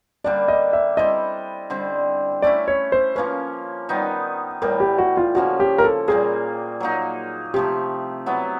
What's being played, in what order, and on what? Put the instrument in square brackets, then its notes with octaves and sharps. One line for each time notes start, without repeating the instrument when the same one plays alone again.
[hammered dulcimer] D3 G3 A#3 D4 [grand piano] D5
[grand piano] D#5
E5
[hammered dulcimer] G3 C4 E4 A4 [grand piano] D#5
[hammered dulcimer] D3 G3 C4
[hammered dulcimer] A3 C#4 E4 [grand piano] D5
[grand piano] C#5
C5
[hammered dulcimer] F3 A#3 C#4 [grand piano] B4
[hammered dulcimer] D#3 G3 B3 D#4
[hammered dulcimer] A2 E3 G3 [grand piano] A#4
[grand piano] G4
F#4
F4
[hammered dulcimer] C#3 F3 A#3 C#4 [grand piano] F#4
[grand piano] G4
A#4
A4
[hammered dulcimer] A#2 G3 A#3 [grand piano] G#4
[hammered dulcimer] F#3 A#3 D#4
[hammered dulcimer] C3 F3 A3 [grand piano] G4
[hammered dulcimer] F#3 B3 E4